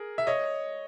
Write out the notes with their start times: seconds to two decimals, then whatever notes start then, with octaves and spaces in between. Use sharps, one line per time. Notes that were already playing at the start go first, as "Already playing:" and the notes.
Already playing: G#4 A#4
0.18 E5
0.27 C#5 D#5